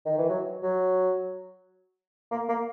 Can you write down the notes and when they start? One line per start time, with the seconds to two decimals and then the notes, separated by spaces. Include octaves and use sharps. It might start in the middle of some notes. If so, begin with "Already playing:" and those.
0.06 D#3
0.18 E3
0.29 F#3
0.63 F#3
2.32 A#3
2.49 A#3